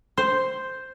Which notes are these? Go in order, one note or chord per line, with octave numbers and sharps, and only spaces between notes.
C5